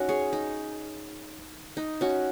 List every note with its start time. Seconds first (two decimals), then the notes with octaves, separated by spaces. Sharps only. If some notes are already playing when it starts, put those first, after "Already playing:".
Already playing: C#4 D#4 F#4
0.09 G#4 C#5
0.33 D#4
1.77 D#4
2.01 C#4 F#4